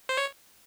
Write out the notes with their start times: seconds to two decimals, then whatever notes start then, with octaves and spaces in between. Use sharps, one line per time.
0.09 C5
0.17 C#5